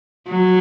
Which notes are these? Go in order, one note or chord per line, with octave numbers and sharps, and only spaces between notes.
F#3